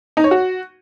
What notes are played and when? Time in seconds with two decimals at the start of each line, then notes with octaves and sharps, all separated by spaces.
0.17 D#4
0.24 C#5
0.31 F#4